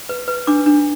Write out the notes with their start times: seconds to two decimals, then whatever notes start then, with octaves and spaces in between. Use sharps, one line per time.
0.09 B4
0.28 B4
0.47 D4 D6
0.66 D4